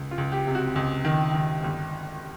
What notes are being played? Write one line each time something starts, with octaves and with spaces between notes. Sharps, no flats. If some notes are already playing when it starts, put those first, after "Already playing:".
Already playing: C#2
F4
C#2
G4
C3
F#4
C#2
D#3
D#3
G1